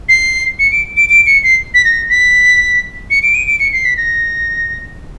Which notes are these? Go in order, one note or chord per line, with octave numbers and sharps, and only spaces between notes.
C7
C#7
D7
D7
D7
C#7
C7
B6
A#6
B6
C#7
D7
D#7
D7
C#7
C7
B6
A#6